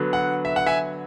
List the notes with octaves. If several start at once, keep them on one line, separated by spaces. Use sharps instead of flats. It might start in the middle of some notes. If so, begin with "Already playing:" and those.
Already playing: D3 F#3 B3
F#5
E5
F#5
E5 G#5